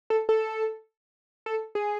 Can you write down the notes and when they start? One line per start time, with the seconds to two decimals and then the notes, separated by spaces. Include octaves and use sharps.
0.10 A4
0.29 A4
1.46 A4
1.75 G#4